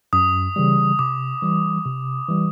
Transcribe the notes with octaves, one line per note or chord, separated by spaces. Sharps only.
F#2 D#6
C#3 E3 G3
C3 D6
E3 G3
C3
E3 G3